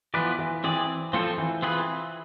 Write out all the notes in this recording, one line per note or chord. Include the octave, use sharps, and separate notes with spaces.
E3 F3 B3 F4 B4 D5
E3
E3 C4 G#4 D5
F3 C4 F4 A4 C5
E3
C4 F4 G#4 B4